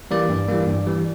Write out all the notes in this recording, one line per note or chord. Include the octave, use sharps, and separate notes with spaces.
E3 G3 A#3 D5
G2
E3 G3 A#3
G2
E3 G3